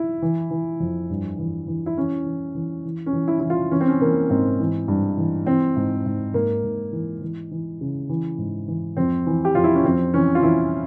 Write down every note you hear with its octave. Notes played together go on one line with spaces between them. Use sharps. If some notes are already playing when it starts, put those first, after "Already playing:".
Already playing: E4
E3
E3
F2
G2
E3
E3
E4
E3 C#4
E3
E3
E3
C#4
E3
E4
E3 E4
F4
E3 C#4
C4
C#4
E3 A#3
G#2 C4
E3
G2
E3
E3 C4
G#2
G#2
G#2 A#3
G#2
E3
E3
E3
C#3
E3
G#2
E3
F2 C4
E3
G4
F2 F4
E4
C#4
F2 C4
E3 C#4
F4
E3 E4